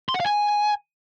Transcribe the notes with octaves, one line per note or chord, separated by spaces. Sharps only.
C6
F#5
F5
G#5